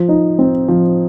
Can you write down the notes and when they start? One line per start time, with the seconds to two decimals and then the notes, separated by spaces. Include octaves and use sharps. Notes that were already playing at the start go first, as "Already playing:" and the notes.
Already playing: F3
0.09 D#4
0.39 C4
0.69 F3